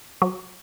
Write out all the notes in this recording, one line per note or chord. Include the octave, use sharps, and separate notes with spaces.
F#3